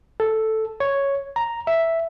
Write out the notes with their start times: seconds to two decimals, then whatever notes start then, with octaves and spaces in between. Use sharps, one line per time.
0.20 A4
0.80 C#5
1.36 A#5
1.67 E5